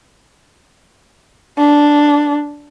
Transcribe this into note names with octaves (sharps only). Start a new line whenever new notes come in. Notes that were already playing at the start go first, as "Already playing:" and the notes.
D4